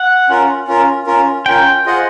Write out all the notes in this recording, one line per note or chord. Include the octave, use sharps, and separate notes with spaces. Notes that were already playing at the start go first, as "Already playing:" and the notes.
Already playing: F#5
C#4 F4 A#4
C#4 F4 A#4
C#4 F4 A#4
C#4 F4 A#4 G5
F4 G#4 C5 D#5 F#5